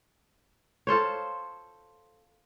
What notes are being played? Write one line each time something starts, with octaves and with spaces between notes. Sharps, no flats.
F4 A4 C5 C#5